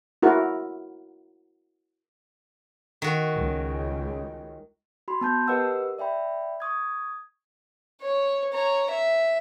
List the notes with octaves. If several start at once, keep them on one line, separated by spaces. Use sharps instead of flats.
E4 F#4 A#4
D#3 F#4
C#2
F#4 B5 C6
B3 A5 G6
G4 A#4 B4 D#5 F#5 E6
D5 E5 G5 B5
C#6 D#6 G#6
C#5
C#5 A#5
E5